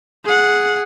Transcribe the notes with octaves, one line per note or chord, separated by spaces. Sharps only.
G#4 F#5